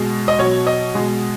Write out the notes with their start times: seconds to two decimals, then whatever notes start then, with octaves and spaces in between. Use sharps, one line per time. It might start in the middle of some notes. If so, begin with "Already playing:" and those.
Already playing: B2 G#3
0.28 D#5
0.39 B2 F#3 C#5
0.67 D#5
0.95 B2 G#3